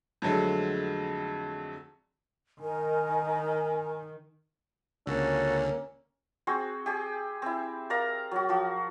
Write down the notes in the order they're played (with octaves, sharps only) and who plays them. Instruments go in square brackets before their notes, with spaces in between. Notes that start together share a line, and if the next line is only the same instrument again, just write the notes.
[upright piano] F2 D3 F#3 G#3 A3
[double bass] D#3 [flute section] D#4 A#4 G#5
[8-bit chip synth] C#2 D3 [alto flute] A#3 [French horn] C#4 [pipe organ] F#4 A4
[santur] C4 F#4 G#4 C5
G4 G#4
C4 E4
A#4 D5 F5 A#5
F#3 F#4
F3 F#4